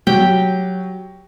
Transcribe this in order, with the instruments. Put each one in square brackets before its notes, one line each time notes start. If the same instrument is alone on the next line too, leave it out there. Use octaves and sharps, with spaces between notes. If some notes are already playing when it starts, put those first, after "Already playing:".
[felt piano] F#3 [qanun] G4 G5